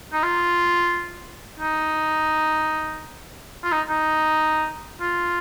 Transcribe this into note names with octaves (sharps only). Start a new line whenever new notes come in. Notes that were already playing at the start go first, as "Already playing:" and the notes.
D#4
F4
D#4
F4
D#4
D#4
F4